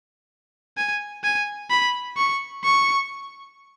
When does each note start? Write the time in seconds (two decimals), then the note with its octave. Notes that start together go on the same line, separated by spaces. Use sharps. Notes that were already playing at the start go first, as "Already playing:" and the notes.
0.77 G#5
1.24 G#5
1.70 B5
2.18 C#6
2.64 C#6